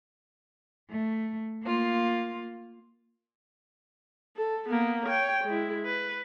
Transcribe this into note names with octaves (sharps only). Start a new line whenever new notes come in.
A3
A#3 F4
A4
A#3 B3
C#5 G5
G#3 E4
B4